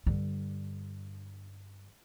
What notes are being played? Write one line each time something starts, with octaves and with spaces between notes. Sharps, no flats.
G2 D3